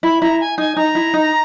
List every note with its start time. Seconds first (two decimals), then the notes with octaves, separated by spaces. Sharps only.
0.03 E4 B5
0.22 E4 A#5
0.40 G#5
0.58 D#4 G#5
0.76 D#4 A#5
0.95 E4
1.14 D#4